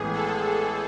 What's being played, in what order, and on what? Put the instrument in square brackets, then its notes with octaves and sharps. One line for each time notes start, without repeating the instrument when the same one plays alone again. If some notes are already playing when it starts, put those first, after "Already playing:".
Already playing: [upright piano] A1 A2 G#3 B3 [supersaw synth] G#4
[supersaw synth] A4
G#4